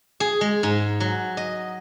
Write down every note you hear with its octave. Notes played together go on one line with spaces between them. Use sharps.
G#4
G#3
G#2
F#3
D#5